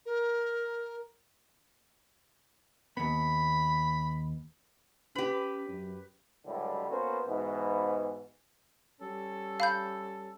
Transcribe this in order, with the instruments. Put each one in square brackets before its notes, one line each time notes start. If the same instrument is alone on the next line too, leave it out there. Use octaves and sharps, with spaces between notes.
[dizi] A#4
[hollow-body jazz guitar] D#2 B3 [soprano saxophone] B5
[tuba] C#4 [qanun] G4 B5 [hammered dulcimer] B4
[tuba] F#2
[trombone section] C#2 F#2 A2 D3 G3
A#3 B3 C#4 F#4 A#4 C5
G#2 B2 E3
[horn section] G3 C#4 A4
[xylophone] F5 B5 G6